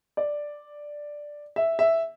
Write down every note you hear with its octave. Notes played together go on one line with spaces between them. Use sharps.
D5
E5
E5